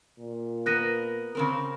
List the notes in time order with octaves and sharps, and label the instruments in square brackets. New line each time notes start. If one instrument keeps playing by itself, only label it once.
[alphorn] A#2
[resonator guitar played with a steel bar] B3 A#4 [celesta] F#6 A#6 D#7
[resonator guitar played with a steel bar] C#3 C4 A#4